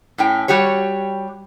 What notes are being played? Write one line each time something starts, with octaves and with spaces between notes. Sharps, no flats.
A2 C#4 G5
G3 F#4 G4 C#5